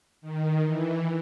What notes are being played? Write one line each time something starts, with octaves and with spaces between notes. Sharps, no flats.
D#3
E3